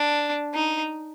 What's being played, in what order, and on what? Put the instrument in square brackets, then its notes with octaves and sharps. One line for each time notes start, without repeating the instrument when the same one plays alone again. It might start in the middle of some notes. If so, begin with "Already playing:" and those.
Already playing: [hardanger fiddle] D4
D#4